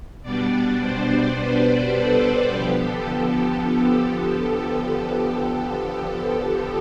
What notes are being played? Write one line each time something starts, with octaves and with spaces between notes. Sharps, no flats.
B2 G3 B3 D4 D5
C5
B4
A4
D3 F3 B3 G4
A4
A4